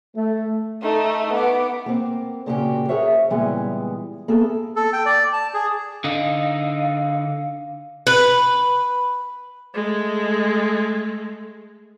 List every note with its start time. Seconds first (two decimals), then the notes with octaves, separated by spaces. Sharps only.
0.17 A3
0.83 A3 D#4
1.34 B3 D6
1.86 A#3 C4
2.46 A#2 C#3 A#3 C#4 F#4 G4
2.88 G#4 A#4 C5 C#5 E5 F#5
3.30 A#2 C#3 E3 G3 G#3 B3
4.28 A#3 B3 G#4 A4
4.76 A4
4.93 G5
5.06 D5
5.33 A5
5.54 G#4
6.04 D3 D#4 F5
8.07 B4
9.74 G#3 A3